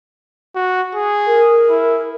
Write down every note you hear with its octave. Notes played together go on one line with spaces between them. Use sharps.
F#4
G#4
A#4
E4